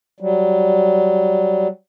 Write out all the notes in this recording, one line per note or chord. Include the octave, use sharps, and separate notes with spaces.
F#3 G3